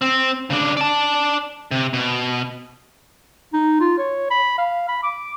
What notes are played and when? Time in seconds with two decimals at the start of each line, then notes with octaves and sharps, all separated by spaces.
0.02 C4
0.50 C#3 D4
0.77 D5 A5
1.71 C3
1.93 B2
3.53 D#4
3.80 F4
3.98 C#5
4.30 B5
4.58 F5
4.88 B5
5.03 D6